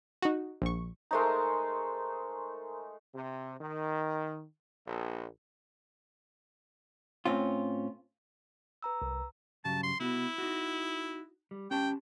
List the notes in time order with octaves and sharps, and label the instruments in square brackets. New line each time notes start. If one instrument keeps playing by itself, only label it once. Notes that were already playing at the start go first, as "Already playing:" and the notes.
[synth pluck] D#4 F#4
A#1 C#6
[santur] G#3 A3 D#4 [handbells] A#4 C5 A#5
[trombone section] C3
D#3
A#1
[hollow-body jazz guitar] A2 C4 C#4 F4
[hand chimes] B4 A#5 E6
[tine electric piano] C2
[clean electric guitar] G2 C#3 F#3 [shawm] A5
[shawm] C6
[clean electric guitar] C2 B3 F#4 [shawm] E4
[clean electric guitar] D#4 F#4
G3
[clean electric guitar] C#4 G4 A5 [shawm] G5